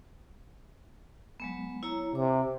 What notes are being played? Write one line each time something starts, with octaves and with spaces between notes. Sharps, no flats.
F#3 G#3 B3
E4 C#5 A#5
C3 D6